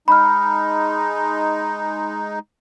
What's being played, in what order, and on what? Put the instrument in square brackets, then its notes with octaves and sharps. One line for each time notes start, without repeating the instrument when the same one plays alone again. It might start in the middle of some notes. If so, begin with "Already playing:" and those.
[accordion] G#3 D#4 [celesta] B5 F6